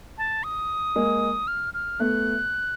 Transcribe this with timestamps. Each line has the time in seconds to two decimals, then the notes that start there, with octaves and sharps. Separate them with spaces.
0.18 A5
0.44 D#6
0.96 G#3 A#3
1.47 F6
1.74 F6
2.00 A3 B3 F#6